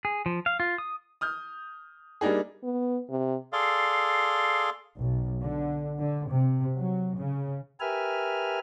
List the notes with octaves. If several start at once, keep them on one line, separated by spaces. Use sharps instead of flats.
G#4
F3
F5
F4
D#6
D#6 F6 G6
G3 A#3 D4 D#4 G#4
B3
C3
G#4 A4 D5 F5 C6
B1
D3
D3
C3
F#3
C#3
G4 A#4 B4 E5 G#5 F6